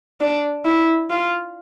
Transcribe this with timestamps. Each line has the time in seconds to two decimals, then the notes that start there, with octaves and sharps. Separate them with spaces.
0.21 D4
0.65 E4
1.10 F4